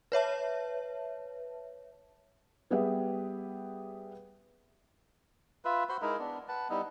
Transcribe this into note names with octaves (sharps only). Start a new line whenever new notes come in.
B4 C#5 E5 A5
G3 B3 G4 G#4 B4 E5
F4 B4 E5
F#4 C5 B5 C6
G#3 D#4 E4 A#4
B3 D4
B4 F#5 A5
G3 B3 D#4 E4